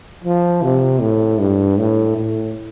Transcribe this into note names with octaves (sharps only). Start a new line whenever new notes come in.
F3
C3
A2
G2
A2
A2